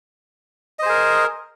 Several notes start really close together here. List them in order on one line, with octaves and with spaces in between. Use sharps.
D#5 C5 G#4 A#4